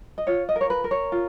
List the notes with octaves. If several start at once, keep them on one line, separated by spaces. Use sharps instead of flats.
D#5
F4 C#5
D#5
A#4
C#5
B4
A#4
C#5
F4